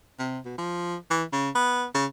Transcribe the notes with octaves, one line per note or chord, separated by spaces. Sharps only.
C3
B2
F3
E3
C#3
B3
C#3